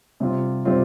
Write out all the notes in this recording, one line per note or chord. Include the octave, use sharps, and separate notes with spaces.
C3 G3 C4 F4
C3 G3 C4 F4